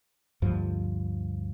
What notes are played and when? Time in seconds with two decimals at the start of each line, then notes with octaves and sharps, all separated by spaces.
0.42 D2 G2 F3